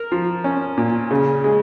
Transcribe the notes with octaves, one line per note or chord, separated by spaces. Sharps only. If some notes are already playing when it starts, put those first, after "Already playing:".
Already playing: A#4
F3
C#4
A#2
C#3
G#3